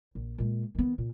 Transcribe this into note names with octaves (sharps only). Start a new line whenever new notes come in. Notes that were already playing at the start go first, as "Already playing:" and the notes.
A#1
A#2 G#3
D#3 B3
A#2